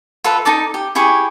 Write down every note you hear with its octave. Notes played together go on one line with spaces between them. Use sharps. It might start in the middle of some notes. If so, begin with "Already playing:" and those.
F4 A4 B4 E5
D#4 A4 A5 D6
G4
E4 G4 G#4 C#6